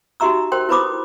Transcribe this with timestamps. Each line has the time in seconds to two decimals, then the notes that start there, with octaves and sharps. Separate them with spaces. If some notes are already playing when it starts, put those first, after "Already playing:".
0.20 D#4 F#4 G4 E5 A#5 E6
0.52 A#4 C5 G5 C6
0.69 E4 B4 C5 B5 D6 D#6